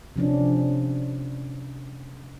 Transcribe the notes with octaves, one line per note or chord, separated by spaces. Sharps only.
C3 F3 C#4 D4